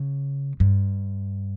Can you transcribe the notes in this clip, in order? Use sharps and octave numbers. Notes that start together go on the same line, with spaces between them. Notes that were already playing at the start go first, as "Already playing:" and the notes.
Already playing: C#3
G2